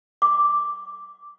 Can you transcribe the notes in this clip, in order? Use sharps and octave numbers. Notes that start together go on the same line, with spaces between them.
D6